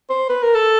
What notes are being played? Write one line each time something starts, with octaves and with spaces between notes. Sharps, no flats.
C5
B4
A#4
A4